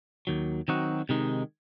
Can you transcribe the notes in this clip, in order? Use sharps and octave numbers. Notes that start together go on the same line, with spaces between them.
D#2 D#3 F#3
D#3 F#3 C4 D#4 F#4
C3 D#3 G#3 D#4